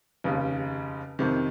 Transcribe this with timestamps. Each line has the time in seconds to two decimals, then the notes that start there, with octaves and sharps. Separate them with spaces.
0.24 F1 D#2 C#3
1.19 F2 C3 D#3